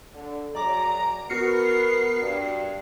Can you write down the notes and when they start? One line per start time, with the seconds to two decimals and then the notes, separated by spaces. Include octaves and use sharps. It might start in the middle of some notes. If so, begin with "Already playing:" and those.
0.14 D3
0.55 F#2 F#3 G#4 D5 A#5 D6
1.30 B3 F#4 A#4 F6 C7 C#7
2.22 G2 D4